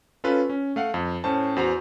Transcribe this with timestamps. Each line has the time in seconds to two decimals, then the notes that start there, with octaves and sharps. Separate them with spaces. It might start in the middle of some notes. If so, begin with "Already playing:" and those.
0.24 C#4 F4 A4 B4
0.49 C#4
0.76 A3 F5 F#5
0.94 F2
1.24 A2 C#4 C5 A5
1.56 E2 F#4 C5 A#5